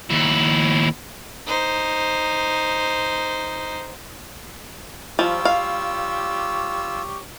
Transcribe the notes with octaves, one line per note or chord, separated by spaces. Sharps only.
D#2 E4
D#4 C5
F3 G3 F4 G4 C#5 E6
F5